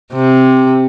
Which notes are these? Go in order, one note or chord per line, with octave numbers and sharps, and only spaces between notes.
C3